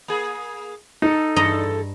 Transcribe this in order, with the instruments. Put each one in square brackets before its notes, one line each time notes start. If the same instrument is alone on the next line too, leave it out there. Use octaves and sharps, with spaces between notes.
[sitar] A#3 G#4
[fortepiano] D#4 [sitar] A4
[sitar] E2 A4 [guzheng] G2 D#5 A#5